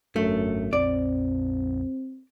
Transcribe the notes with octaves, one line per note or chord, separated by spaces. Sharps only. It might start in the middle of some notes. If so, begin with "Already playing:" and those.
G#1 F#2 A3 D4
A#1 F2 F3 C4 D5